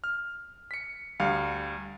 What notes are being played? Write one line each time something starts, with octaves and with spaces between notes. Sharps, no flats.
F6
B6 C#7
D2 G3 F5 C#7